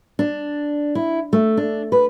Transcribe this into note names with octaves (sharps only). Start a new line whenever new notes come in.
D4
E4
A3
D4
B4